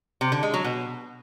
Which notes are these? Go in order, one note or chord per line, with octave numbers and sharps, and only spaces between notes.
C3
D3
G#3
F#3
B2